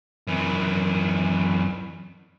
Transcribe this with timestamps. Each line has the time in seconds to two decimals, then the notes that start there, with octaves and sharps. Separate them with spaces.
0.27 F#2 E3